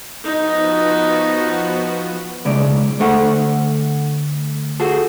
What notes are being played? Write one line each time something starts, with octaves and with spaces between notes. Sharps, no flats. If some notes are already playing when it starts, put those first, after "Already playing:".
F3 B3 D#4 F#4
B1 C#3 G#3 D5
D2 A3 A4 F#5
F#4 G#4 A4